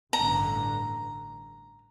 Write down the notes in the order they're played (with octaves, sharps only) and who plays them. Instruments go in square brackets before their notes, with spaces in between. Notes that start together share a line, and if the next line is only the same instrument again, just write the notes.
[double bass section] A1 G2 D3 [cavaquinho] A#5